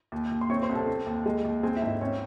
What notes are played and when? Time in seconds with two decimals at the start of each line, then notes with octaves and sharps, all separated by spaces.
0.12 D#2
0.31 D#2
0.41 C6
0.50 C4 C#5 C#6
0.62 C5 C6
0.69 C2
0.75 A4 A5
0.87 C4
1.06 D#2
1.26 G#3
1.45 D#2
1.63 C4 G#4 G#5
1.76 E4 E5
1.82 G#2
1.88 E4 E5
2.01 C4 C#4 C#5